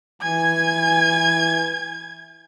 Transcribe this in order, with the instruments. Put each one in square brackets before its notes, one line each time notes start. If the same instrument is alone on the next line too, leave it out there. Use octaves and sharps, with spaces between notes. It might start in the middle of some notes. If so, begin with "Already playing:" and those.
[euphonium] E3 [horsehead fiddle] G#5 [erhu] G#6